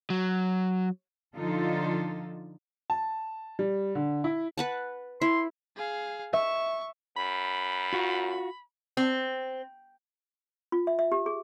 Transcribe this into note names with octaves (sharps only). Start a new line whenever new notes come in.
F#3
D3 F3 D#4 F4 A4
A5
G3
D3
E4
B4 F#5 A5
E4 C6
G#4 F5
E5 C#6
F#2 B5
F4 F#4
C4
F4
E5
E5
G4
G#4